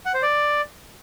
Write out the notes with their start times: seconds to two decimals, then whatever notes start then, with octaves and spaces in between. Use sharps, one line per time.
0.06 F#5
0.14 C5
0.23 D5